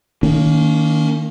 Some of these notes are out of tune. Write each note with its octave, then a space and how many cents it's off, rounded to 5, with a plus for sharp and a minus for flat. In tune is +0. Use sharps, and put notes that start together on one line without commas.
D#3 +0 A#3 -20 C#4 +40